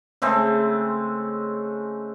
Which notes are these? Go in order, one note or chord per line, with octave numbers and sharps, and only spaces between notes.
C#3 G#3 A3 C4